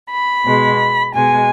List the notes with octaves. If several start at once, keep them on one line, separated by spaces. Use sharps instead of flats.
B5
B2 G#3
B2 G#3 G#5